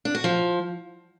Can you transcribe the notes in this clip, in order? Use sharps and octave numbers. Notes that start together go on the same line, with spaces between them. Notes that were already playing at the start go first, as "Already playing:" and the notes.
D4
F#4
F3